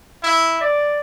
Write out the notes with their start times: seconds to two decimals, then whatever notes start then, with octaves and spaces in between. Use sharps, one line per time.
0.23 E4
0.61 D5